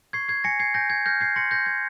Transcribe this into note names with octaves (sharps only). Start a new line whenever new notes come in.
C#6 G#6 C7
G#6 C7
G#5 A#6 C#7
G#6 C7
G#5 G6 A#6
G#6
F6 G6 A#6
G#6 C7
C6 A#6 C#7
G6 A#6
G6 G#6